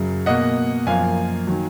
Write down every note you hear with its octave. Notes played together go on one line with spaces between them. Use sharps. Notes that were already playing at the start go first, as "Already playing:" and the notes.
Already playing: F#2 C#3 F#3
B2 A#3 D#5 F#5
F#2 F3 A#3 F5 G#5
D#3 F#3